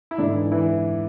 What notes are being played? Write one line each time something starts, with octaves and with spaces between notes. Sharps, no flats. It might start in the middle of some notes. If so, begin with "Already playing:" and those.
E4
G#2 D3 D4
E3
E3 E4